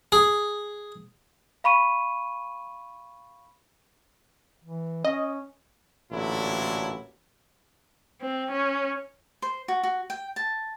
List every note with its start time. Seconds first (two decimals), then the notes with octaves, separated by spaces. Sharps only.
0.12 G#4
1.64 F5 B5 C#6 D#7
4.64 E3
5.05 C#4 D#5
6.12 A1 A#2 D3 F#3 E4
8.21 C4
8.51 C#4
9.42 C5
9.68 F#4
9.83 F#4
10.10 G5
10.36 A5